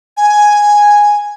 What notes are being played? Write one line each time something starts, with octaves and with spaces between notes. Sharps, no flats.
G#5